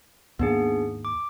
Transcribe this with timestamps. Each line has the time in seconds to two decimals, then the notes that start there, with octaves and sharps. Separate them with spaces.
0.39 D#2 G#2 A#3 B3 D4 G#4
1.05 D6